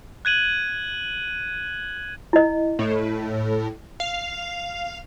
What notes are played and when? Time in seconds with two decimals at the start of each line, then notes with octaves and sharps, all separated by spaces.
0.25 F#6 G#6 D#7 F#7
2.33 E4 D#5
2.79 A2
4.00 F5